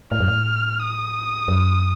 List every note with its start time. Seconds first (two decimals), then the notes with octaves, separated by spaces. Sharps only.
0.11 A2 F6
0.20 F#2
0.28 A2
0.80 D#6
1.48 F#2